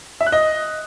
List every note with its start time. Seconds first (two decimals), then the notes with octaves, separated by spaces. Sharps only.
0.21 E5
0.26 F#6
0.32 D#5